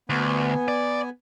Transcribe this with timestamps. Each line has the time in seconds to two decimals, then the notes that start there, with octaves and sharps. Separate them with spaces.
0.10 D2 B3 G#5
0.68 D5